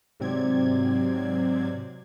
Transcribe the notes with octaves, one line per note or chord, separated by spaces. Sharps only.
G#2 C3 F#3 C4 D5 G#6